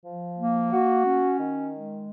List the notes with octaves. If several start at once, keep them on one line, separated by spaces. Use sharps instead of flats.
F3
A#3
F#4
C#4
D#3
G#3